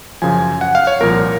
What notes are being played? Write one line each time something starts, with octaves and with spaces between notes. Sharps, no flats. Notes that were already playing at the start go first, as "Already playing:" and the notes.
F#2 C#3 F3 G#5
F#5
F5
C#5
C2 A#2 F3 A#4